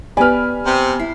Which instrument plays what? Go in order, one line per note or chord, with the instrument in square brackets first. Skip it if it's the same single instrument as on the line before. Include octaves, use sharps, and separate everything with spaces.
[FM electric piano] B3 G4 B5 [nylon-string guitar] B4 D5 [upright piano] G#5 F6
[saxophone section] C3
[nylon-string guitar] E4 [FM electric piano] C7